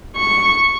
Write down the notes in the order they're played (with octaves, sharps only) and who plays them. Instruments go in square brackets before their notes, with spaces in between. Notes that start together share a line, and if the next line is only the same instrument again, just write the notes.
[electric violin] C#6